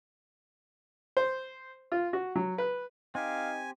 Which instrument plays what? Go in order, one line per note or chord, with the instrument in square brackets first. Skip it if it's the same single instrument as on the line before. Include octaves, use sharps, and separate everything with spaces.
[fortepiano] C5
F4
F#4
F#3
B4
[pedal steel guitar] C4 G4 [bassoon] D#4 [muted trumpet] F5 [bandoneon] G#5